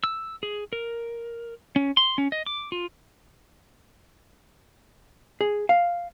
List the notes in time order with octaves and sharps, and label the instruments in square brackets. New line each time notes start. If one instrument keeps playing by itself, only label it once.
[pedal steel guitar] E6
G#4
A#4
C#4
C6
C#4
D#5
D6
F4
[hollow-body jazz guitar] G#4
F5